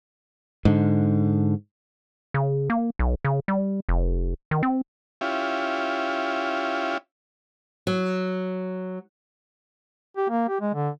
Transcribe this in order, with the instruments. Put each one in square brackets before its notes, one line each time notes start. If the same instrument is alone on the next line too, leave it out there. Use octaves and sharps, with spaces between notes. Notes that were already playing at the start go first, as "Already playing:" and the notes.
[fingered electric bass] G#2 D3
[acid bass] C#3
A#3
B1
C#3
G3
F1
D#3
C4
[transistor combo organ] C#4 E4 F4 G4
[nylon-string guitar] F#3
[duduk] G4
A#3
G4
G#3
D3